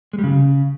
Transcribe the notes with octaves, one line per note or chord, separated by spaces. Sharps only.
G#3
G3
C#3